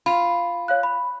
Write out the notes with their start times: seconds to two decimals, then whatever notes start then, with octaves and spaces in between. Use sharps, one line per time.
0.06 F4 B5
0.68 C#5 F5 F#6
0.83 B5